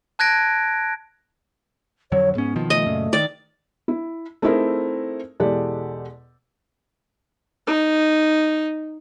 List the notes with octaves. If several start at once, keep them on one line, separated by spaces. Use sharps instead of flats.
A5 F#6 G#6 A#6 D7
F2 D3 F#3 C#5
G#2 B3 C#4
B2 D#3 F3
A3 D#5
F#2 A#2 C#3
D#3 D5
E4
A3 C4 D#4 E4 G#4 A#4
E2 B2 G#3 G4 A4 D5
D#4